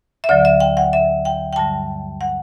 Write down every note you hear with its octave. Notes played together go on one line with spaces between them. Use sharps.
E5
D2 D3 F#3 D5
E5
G5
F#5
E5
G5
G5
G2 D3 G3 A5
F#5